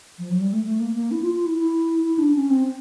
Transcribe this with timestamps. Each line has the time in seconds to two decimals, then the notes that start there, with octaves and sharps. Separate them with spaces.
0.19 F3
0.30 F#3
0.41 G3
0.53 A3
0.65 A3
0.80 A#3
0.96 A#3
1.11 E4
1.22 F4
1.34 F4
1.46 E4
1.57 E4
2.04 E4
2.19 D4
2.35 C#4
2.50 C4